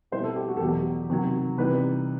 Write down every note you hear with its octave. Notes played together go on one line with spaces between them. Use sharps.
B2 G3 C4 E4 C5
A4
G4
F#4
A4
E2 B2 F#3 A3 G4
C3 D#3 F#3
C3 E3 G3 D#4 B4